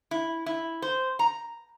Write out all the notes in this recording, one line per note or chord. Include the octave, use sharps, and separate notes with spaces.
E4
E4
C5
A#5